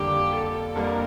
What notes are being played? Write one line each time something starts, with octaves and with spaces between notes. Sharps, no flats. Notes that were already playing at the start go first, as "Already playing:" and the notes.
Already playing: F2 D3 G3 A#3 G4
A4
F2 D3 G3 A#3 A#4